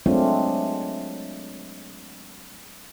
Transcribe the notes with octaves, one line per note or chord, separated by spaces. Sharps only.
F#3 G#3 A3 C4 D4 F4